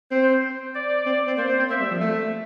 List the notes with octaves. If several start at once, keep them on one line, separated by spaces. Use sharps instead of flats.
C4 C5
D5
C4
C4
A#3 C5
C4
C4
A#3 E5
G3
F3
A3